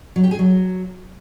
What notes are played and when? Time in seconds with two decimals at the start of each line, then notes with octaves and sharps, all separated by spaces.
0.16 F#3
0.23 G4
0.31 G#4
0.39 F#3